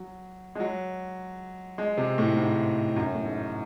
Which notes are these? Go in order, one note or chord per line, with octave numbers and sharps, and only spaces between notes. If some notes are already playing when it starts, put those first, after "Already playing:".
Already playing: F#3
G#3
F#3
G#3
C3
A2
G#2
F#2
A2
G#2